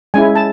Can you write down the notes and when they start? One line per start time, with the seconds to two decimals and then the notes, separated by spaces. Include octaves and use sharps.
0.14 G#3 C#4 E4 G#5
0.35 A5